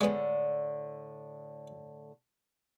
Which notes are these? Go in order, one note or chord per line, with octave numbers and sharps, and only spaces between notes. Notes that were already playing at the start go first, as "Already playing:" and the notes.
A2 D3 G#3 B3